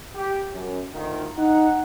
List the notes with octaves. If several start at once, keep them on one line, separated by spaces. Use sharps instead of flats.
G4
F#2
D2 D#3 F4
D#4 F#5